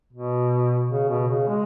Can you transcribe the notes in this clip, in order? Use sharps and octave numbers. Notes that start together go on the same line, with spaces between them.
B2
C#3
B2
C#3
G#3